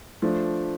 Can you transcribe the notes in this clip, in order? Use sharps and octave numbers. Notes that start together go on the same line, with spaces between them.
F3 A3 D4